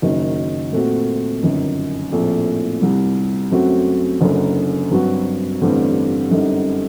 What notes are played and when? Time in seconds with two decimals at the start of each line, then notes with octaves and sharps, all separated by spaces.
0.02 F#1 F#2 D#3 F#3
0.72 A#2 A3 C4 F#4
1.42 G1 F#2 D#3
2.12 A#1 A2 A3 C4
2.81 C2 C3 G3
3.51 F#2 F#3 A3 C4 F#4
4.21 F#1 F#2 D3
4.91 G2 F#3 C4 F#4
5.61 A1 G2 D3 G3 C4
6.31 F#2 D3 G3 C4 D#4